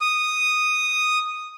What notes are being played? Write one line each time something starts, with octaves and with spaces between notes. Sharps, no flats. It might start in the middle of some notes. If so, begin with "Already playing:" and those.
D#6